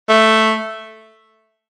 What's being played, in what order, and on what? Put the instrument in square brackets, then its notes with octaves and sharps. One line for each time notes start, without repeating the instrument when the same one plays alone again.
[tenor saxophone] A3